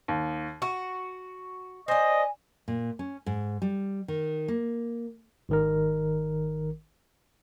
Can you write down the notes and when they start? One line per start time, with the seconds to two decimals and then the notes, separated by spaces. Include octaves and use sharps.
0.08 D#2
0.62 F#4 C#6
1.88 C5 D5 D#5 G#5
2.68 A#2
2.99 C#4
3.26 G#2
3.62 G3
4.08 D#3
4.48 A#3
5.49 G#1 D#3 A#4